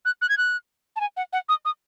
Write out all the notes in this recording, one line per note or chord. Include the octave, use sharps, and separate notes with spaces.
F#6
F#6
G#6
F#6
A5
G#5
F#5
F#5
D#6
D#6